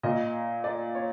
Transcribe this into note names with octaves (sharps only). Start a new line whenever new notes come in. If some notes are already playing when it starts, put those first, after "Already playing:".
A#2 D#5
D5
C#5